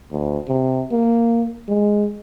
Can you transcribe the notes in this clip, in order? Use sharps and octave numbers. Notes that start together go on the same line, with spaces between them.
D2
C3
A#3
G#3